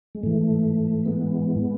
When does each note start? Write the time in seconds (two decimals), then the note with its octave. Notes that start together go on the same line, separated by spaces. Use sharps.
0.15 G#3
0.23 G#2 E3 A3
1.06 G#3 B3